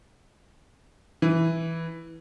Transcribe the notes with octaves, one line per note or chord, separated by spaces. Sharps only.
E3